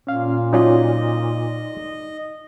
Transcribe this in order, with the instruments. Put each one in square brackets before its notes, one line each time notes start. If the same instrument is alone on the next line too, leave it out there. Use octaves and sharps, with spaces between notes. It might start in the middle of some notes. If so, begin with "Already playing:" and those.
[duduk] A#2 [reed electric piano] C#4 F5
[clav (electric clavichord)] F#3 C#4 F4 [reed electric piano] D#4 D5 [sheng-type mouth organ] D#5